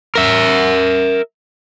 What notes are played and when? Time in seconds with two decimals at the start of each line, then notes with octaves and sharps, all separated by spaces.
0.15 A#4 E5